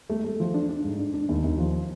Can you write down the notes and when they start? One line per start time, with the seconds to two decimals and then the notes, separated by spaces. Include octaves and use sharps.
0.10 A3
0.24 A3
0.40 F3
0.54 D4
0.69 D4
0.84 G#2
0.99 D4
1.14 D4
1.29 D#2
1.44 D#2
1.58 F3